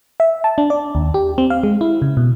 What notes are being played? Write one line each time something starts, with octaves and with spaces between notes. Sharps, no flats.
E5
A5
D4
D5
D#2
G4
C4
F5
G#3
E4
C#3
B2